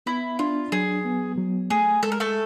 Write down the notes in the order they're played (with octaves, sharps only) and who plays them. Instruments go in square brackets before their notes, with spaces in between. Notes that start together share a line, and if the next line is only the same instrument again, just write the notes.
[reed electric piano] B3 [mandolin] E4
[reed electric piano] D4 [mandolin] F4
[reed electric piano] F#3 [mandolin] G#4
[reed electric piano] B3
F#3
[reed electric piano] A3 [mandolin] G#4
[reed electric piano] G#3 [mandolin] A4
[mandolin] A#4
A3 A4